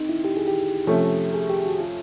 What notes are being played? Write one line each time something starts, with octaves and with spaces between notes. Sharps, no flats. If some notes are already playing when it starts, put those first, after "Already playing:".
Already playing: D3 C4 D#4
E4
G4
G#4
G4
C3 F3 A3 C#4
G#4
G4
F#4
F4